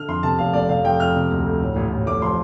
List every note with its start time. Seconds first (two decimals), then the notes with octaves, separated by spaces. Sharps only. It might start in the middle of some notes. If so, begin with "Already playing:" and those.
Already playing: D3 F6
0.08 F2 C6
0.23 C3 A5
0.38 F1 F5
0.53 F1 D5
0.69 C3 F5
0.84 F2 G5
1.00 F2 F6
1.16 C3
1.31 D2
1.46 D2
1.62 A2
1.76 A1
1.91 A1
2.06 F1 D6
2.21 F3 C6